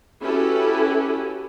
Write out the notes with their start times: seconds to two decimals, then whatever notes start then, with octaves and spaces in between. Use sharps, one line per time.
0.21 C#4 E4 F#4 G4 A4 B4